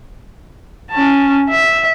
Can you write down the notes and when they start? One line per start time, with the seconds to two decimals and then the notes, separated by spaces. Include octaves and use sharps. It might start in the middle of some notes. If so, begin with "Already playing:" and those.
0.91 C#4 A5
1.50 E5